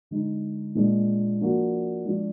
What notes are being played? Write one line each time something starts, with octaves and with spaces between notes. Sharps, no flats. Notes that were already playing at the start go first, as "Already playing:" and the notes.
D3 G#3 D#4
A#2 G#3 D4
F3 A#3 D4 F#4
F3 G#3 D4 F4